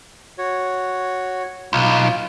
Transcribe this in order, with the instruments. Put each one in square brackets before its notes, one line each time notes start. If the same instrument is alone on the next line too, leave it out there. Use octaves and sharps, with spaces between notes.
[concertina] F#4 C#5
[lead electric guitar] B1 [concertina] F4